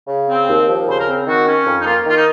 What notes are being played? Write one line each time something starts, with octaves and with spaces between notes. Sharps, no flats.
C#3
C4
D#2
F3
C#3 C5
A#4
C4
D#3 F#4
C#4
F2
D#4
A#3 F4
D#3 F4
D#4